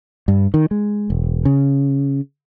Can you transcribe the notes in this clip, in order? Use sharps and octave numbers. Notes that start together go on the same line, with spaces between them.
G2
D#3
G#3
E1
C#3